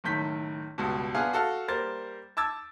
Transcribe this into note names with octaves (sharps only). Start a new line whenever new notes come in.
F#1 A2 D#3 G6 B6
C#2 G2 B2
B3 D4 F4 G#4 F5
F#4 A4 F5
G3 A#3 A#4 C5 A6
A5 D6 E6 G#6 A6